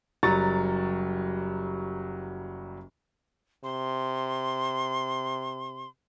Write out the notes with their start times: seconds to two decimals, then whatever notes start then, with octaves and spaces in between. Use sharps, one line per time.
0.23 F#1 F#3 G3 A#5 C#6 A6
3.64 C3 C6